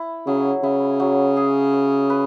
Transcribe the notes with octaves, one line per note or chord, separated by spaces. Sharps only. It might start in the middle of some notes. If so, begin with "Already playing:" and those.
Already playing: E4
C#3 F#3
C#3 E4
F#3
G#4
C#5
B4